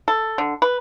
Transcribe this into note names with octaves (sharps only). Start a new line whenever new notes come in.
A4
D3
B4